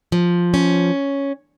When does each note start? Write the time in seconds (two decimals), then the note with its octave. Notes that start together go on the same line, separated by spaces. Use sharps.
0.12 F3
0.54 C#4